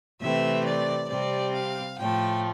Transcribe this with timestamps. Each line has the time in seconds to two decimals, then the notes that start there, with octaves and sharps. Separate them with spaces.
0.20 C3 E3 A3 C4 E5
0.65 D5
1.09 C3 G3 C4 D5
1.53 F5
1.97 A2 F3 A3 G5